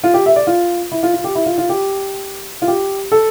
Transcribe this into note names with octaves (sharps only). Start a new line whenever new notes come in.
F4
G4
E5
D5
F4
E4
F4
F4
G4
E4
F4
F4
G4
F4
G4
A4